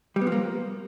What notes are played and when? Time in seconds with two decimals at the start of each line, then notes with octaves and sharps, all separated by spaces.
0.16 G3
0.21 B3
0.27 F3
0.32 A#3